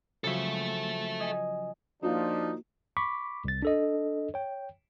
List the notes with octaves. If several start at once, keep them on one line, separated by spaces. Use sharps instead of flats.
C#3 F3 F#3 A4 E5
D#5 G#5 D#6
F3 A#3 D4 D#4 F4 F#4
B5 C#6 D6 B6
C2 A6
D4 A4 D#5
C#5 G5